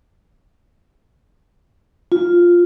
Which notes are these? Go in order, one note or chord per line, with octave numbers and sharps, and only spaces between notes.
F4